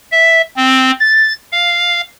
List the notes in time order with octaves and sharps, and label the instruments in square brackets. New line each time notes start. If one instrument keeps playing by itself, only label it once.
[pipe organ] E5
C4
A6
F5